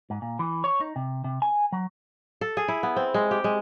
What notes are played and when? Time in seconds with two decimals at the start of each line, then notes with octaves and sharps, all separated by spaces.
0.10 G#2
0.22 A#2
0.39 E3
0.64 C#5
0.81 D#4
0.96 C3
1.24 C3
1.42 G#5
1.72 F#3
2.41 A4
2.57 G#4
2.68 E4
2.83 B3
2.96 C4
3.14 G#3
3.31 G4
3.44 G#3